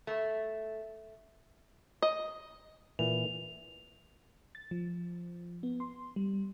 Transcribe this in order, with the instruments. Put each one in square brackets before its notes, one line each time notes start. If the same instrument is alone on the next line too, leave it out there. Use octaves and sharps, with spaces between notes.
[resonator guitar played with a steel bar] A3
[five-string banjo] D#5
[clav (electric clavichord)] A#2 E3 [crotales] F7
[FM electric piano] A6
F3
B3
C6
G3